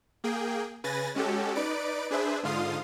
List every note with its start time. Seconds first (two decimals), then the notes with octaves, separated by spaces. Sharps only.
0.24 A#3 G#4 G5
0.84 C#3 B4 G#5 A6 A#6
1.15 G#3 C#4 F#4 G4 A4
1.55 D#4 B4 D5 D7
2.11 D4 G#4 B4 C5 E5
2.43 G#2 D3 F4 F5 C6 D#6